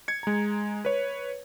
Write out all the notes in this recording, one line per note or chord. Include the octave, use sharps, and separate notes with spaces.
G#6 C#7
G#3 A#5
B4 C#5